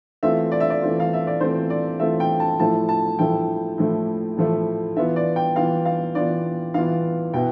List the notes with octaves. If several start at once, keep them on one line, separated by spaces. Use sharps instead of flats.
E3 A3 C4 F4 E5
D5
E5
D5
E3 A3 C4 F4
F5
E5
D5
E3 A3 C4 F4 C5
D5
E3 A3 C4 F4 E5
G5
A5
A2 F3 A3 E4 A5
A5
A2 F3 A3 E4 G5
A2 F3 A3 E4
A2 F3 A3 E4
E3 B3 F4 E5
D5
G5
E3 B3 F4 F5
F5
E3 B3 F4 D5
E3 B3 F4 F5
B2 B3 E4 G5